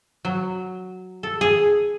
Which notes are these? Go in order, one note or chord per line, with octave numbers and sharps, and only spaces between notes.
F#3
A4
G#4